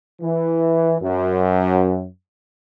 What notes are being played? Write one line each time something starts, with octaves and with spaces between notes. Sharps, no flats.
E3
F#2